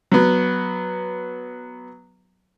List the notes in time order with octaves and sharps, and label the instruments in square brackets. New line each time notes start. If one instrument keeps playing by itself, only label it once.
[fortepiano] F#3 B3